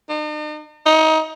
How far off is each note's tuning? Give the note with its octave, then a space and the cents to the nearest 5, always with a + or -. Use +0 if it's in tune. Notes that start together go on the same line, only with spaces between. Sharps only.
D#4 -45
D#4 +25